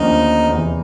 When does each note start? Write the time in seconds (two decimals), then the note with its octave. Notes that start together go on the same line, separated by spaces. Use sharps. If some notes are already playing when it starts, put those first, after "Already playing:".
Already playing: D#2 D3 F3 A3 C#4 D#4
0.49 E2 C3 E3